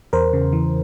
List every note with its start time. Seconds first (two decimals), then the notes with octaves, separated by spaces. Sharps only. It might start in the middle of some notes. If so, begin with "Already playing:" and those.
0.13 E2 A#4 C5
0.33 C#3
0.53 E3